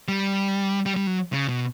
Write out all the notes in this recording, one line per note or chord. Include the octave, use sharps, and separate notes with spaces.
G3
G3
G3
F#3
C#3
B2